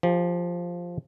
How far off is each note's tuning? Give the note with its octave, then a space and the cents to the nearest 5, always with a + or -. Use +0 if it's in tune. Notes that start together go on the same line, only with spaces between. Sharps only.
F3 +0 G4 +35